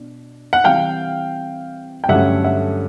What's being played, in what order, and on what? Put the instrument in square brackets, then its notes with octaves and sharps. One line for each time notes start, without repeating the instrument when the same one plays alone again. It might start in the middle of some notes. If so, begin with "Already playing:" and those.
Already playing: [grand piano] B2 D4
[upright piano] F#5
[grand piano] C3 E3 G3 [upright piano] F5 G5
[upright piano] G5
[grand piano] G2 D3 F#3 A3 C#4 [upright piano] E5 F#5
[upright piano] E5 F#5